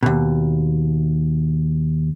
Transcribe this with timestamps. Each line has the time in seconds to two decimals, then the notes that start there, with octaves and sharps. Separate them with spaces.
0.03 D#2 B2